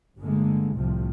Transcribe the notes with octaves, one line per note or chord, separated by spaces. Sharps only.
G1 D3 G#3 A#3
C2 A2 C3 F3